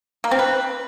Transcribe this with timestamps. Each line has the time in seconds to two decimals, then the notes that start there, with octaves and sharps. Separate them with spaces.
0.24 A#3
0.31 C4
0.39 B4